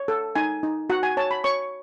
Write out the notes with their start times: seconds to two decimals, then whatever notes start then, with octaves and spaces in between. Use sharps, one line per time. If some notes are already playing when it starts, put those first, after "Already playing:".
Already playing: C#5
0.08 A4
0.35 D#4 G#5
0.63 D#4
0.90 F#4 F#5
1.03 G#5
1.17 C#5 A5
1.31 B5
1.44 C#5 C#6